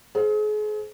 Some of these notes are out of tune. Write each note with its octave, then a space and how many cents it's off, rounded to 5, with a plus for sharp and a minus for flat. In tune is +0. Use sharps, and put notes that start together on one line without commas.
G#4 +35 C5 +0